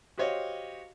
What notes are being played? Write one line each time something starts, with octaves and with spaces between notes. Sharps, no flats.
F#4 G4 C5 C#5 D#5 F5